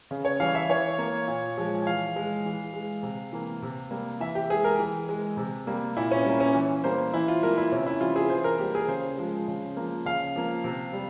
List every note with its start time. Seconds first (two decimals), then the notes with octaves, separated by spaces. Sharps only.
0.11 C#3
0.25 C#5
0.40 E3 G3 F5
0.55 E5
0.69 E3 C#5
0.98 A#3
1.28 A#2
1.57 F3 G#3
1.87 E3 F5
2.16 G#3
2.45 E3
2.74 G#3
3.03 C3
3.33 E3 A#3
3.62 C3
3.91 G3 A#3
4.20 E3 E5
4.35 G4
4.49 G#3 G#4
4.64 A#4
4.79 E3
5.09 G#3
5.37 C3
5.67 G3 A#3
5.97 A#2 E4
6.11 C#4
6.25 G3 A#3
6.40 C#4
6.54 E3
6.84 G3 A#3 C5
7.14 E3 E4
7.28 F4
7.42 G3 A#3 A#4
7.58 E4
7.72 C3 C#4
7.87 E4
8.00 E3 G3 F4
8.16 G#4
8.30 E3 C5
8.44 A#4
8.59 G3 A#3 G4
8.75 G#4
8.88 C#3 C5
9.18 F3 G#3
9.48 C#3
9.77 F3 A#3
10.06 C#3 F5
10.36 F3 A#3
10.64 C3
10.93 G3